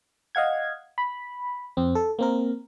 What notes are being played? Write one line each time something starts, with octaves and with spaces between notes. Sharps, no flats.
D#5 F5 F#5 G#6
B5
F2 C4
A4
A#3 C4 A#4